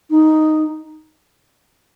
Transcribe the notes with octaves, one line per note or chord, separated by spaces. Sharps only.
D#4